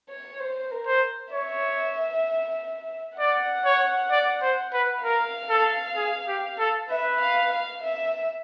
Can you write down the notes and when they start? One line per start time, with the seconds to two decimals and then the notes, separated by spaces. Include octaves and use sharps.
0.10 C#5
0.40 C5
0.71 A#4
0.87 C5
1.32 C#5 E5
3.18 D5 F#5
3.65 C#5
4.11 D5
4.42 C5
4.73 B4
5.04 A#4 F5
5.50 A4
5.96 G#4
6.28 G4
6.59 A4
6.89 B4 E5
7.20 F5
7.51 F5
7.82 E5